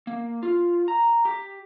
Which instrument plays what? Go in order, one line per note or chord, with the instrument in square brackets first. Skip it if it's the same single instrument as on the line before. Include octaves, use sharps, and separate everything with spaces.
[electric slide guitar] A#3
F4
A#5
G4